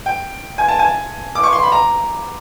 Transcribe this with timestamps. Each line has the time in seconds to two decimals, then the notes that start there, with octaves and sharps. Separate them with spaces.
0.06 G5
0.58 G#5
0.68 A5
0.79 G#5
1.35 D6
1.43 C#6
1.53 C6
1.63 B5
1.72 A#5